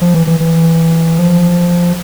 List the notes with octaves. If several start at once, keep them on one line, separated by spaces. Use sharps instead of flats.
F3
E3
E3
E3
F3